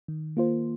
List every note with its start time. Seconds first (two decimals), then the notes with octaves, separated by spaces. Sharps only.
0.08 D#3
0.37 A#3 F4 C5